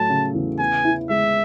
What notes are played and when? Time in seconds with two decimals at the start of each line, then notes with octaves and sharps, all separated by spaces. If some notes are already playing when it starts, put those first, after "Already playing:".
Already playing: A2 F#3 A3 A5
0.10 C#3
0.34 E2
0.59 B3 G#5
0.85 E4
1.10 G#3 E5